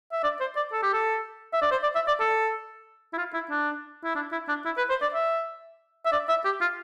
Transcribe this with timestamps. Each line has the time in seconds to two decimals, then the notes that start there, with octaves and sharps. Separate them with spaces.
0.12 E5
0.24 D5
0.40 C5
0.56 D5
0.73 A4
0.83 G4
0.93 A4
1.53 E5
1.61 D5
1.71 C5
1.83 D5
1.95 E5
2.08 D5
2.20 A4
3.13 E4
3.18 F4
3.34 E4
3.51 D4
4.04 E4
4.15 D4
4.32 E4
4.48 D4
4.65 E4
4.77 B4
4.90 C5
5.02 D5
5.14 E5
6.06 E5
6.12 D5
6.29 E5
6.45 G4
6.61 F4